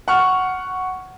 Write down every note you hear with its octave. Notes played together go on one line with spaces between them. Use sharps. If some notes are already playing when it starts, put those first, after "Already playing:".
F#5 C#6 F6